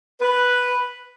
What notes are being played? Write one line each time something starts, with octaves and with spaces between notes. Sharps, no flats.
B4